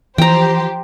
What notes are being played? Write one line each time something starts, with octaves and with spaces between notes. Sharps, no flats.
E3 F3 G4 C5 G5 A#5